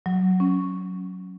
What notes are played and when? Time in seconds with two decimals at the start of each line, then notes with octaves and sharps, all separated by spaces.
0.06 F#3
0.40 C#4